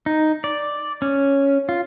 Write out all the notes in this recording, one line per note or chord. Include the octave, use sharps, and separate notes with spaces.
D#4
D5
C#4
F4